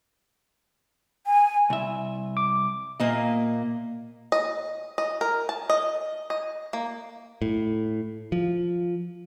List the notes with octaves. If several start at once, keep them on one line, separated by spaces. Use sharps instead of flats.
G#5
C2 E5
D6
A#2 A#3 D#5
D#5
D#5
A#4
A5
D#5
D#5
A#3
A2
F3